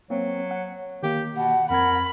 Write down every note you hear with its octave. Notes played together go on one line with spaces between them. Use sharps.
F#3 A#3 C4
F#5
D#3 A#3 G4
B2 F#5
F2 C4 A#4 F#5 B5 G#6